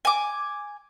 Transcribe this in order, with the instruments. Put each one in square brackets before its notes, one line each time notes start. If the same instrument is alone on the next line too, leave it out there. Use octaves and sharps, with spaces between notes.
[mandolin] G#5 D6